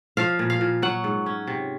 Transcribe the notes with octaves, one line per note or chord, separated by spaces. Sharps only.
F3 F5
A#2
F5
A#2
F#3 F#5
G#2
C#4
C3